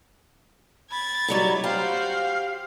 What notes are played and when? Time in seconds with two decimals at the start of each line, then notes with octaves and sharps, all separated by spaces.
0.91 B5 G#6 A6
1.28 F#3 G3 D#4
1.64 F#4 G4 C5 F5